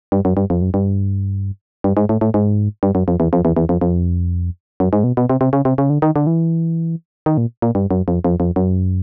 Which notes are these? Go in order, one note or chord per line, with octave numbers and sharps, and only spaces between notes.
G2
F#2
G2
F2
F#2
G2
G2
G#2
A2
A2
G#2
G2
F#2
F2
E2
F2
E2
E2
F2
F2
F#2
G#2
B2
B2
C3
C3
C#3
C3
C#3
D3
D#3
D3
E3
D#3
A#2
A#2
G2
F#2
F2
F2
F2
F#2